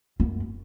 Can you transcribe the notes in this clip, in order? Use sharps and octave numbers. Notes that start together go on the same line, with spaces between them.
F#2